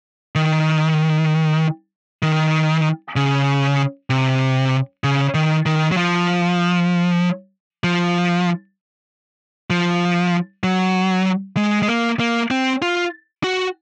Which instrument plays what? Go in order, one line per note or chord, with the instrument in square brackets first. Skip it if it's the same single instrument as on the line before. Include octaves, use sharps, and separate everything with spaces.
[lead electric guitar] D#3
D#3
C#3
C3
C#3
D#3
D#3
F#3
F3
F3
F3
F#3
G#3
G#3
A#3
A#3
C4
F4
F#4